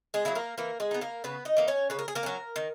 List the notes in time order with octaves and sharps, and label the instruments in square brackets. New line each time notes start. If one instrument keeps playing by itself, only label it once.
[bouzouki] G#3 G#4
F#3 A#3 E4
A#3 A#4
E3 A#3 A#4
G#3 G#4
B3 D#4
A#3 A#4
C#3 B3 B4
D#4 D#5
E3 A#3 D#4
C#4 C#5
C#3 B4
A#4
G#4
A#3 A#4
F#3 C#4
D#3